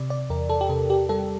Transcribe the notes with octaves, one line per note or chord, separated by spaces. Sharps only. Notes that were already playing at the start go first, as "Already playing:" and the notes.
Already playing: C3 D5
D5
E2 A#4
A4
G4
C3 A4
G4
G3 A4